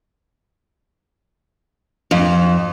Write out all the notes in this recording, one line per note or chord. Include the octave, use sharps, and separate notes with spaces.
F2